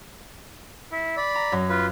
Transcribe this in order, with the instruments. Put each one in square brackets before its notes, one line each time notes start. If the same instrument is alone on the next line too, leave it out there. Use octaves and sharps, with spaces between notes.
[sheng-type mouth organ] E4
D5 B5
[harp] A#5
F#2
[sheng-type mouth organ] F4 B4